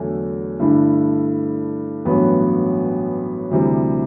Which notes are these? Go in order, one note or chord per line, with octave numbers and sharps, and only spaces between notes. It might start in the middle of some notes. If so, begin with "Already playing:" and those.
Already playing: E2 D3 F#3 A3
G2 D3 A3 E4
A1 G2 F#3 B3
D2 C3 E3 G3